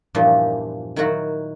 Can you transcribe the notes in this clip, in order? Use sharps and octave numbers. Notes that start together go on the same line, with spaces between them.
E2 G2 A#2 E3 F3
D#3 F#3 E4 F#4 A#4